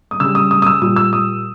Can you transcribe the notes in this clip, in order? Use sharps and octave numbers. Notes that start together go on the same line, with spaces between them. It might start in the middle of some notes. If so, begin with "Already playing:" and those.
D#6
C#3 G3 E6
D#6
D#6
D#6
E6
A#2 G3 D#6
E6
D#6